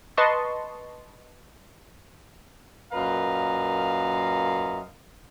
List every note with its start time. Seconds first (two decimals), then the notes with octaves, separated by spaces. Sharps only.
0.17 B4 D#5 A5 C6 C#6
2.93 F#2 A#2 B4 D#5 F5 A#5